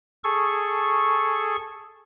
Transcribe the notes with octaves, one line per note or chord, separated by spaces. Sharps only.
G#4 A4 C#6